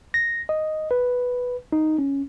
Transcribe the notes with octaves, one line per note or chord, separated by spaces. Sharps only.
A#6
D#5
B4
D#4
C#4